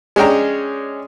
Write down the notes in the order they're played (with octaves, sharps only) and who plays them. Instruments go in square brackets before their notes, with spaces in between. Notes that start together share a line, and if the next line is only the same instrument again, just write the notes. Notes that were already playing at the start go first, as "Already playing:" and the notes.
[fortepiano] G#3 C#4 D4 G5 A#5